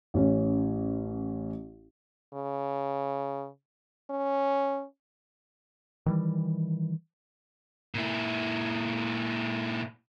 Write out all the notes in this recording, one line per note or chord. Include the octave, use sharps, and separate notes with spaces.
A1 C#4
C#3
C#4
D#3 E3 G3
A#2 E4